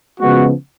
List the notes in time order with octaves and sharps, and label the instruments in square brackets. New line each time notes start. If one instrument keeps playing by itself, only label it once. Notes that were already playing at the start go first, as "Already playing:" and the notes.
[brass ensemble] C#3 F3 G#3 B3 F#4